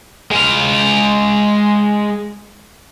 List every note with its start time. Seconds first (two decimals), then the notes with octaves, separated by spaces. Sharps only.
0.31 G#3 F5